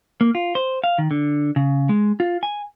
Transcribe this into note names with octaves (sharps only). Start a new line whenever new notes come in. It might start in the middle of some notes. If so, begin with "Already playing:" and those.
A#3
F4
C5
F5
D#3
D3
C#3
G#3
F4
G#5